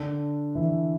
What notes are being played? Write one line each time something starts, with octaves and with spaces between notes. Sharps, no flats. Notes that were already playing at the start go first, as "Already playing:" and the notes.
Already playing: D3 D4
E3 E4